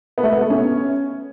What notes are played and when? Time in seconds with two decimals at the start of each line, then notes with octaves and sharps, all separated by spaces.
0.18 B3
0.23 A3
0.33 B3
0.41 A3
0.50 C#4